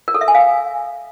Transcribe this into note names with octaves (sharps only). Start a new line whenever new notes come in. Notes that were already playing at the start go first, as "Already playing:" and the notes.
A#4
A4
E5
G#5
F5